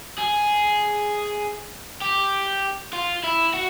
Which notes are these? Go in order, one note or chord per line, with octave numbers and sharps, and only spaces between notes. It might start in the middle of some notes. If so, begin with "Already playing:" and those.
G#4
G4
F4
E4
F#4